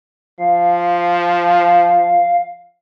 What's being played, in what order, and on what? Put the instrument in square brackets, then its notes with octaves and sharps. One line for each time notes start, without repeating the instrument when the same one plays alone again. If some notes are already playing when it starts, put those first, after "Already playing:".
[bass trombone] F3 [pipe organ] F5